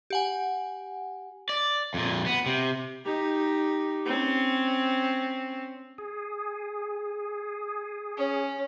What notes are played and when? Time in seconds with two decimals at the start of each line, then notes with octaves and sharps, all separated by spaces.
0.10 G4 F#5 G#5
1.49 D5
1.94 F2 A#2
2.26 B3
2.46 C3
3.05 D#4 G4
4.06 C4 C#4
5.98 G#4
8.17 C#4